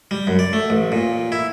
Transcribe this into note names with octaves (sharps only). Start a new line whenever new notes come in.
G3
F#2
D5
A3
A1
A#2
E4